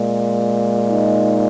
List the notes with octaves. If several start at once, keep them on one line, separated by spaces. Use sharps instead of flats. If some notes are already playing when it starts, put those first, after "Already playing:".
Already playing: A#2 G#3
D#4